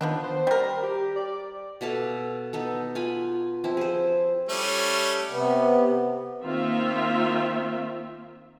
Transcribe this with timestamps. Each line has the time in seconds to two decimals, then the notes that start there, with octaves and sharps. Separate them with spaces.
0.01 D#3 F3 B3 D4
0.23 C5
0.47 G3 A#4
0.83 G4
1.16 D5
1.81 B2 E4 A4 F5
2.53 B3 D#4 A4
2.95 F4 G#5 B5
3.64 F3 C4 E4
3.77 G#4 C5
4.49 G3 A3 C#4
5.31 C3 B3
6.42 D#3 A#3 C4 F4 E5